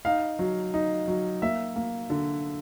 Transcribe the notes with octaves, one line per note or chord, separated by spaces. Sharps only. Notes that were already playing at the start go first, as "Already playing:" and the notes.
D#4 F5
F#3
D#4
F#3
A#3 E5
A#3
D3